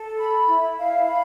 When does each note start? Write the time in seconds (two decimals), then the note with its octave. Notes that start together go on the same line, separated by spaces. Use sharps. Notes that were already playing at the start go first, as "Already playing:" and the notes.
Already playing: A4
0.17 B5
0.47 E4
0.78 F5
1.08 B5